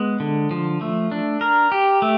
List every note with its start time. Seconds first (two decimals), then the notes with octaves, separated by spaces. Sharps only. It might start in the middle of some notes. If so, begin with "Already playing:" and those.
Already playing: G#3 B3
0.20 D3
0.51 F3
0.81 A3
1.12 D4
1.41 A#4
1.72 G4
2.02 A3